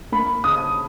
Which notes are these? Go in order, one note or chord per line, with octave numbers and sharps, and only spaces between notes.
A#3 B5
C#3 D#6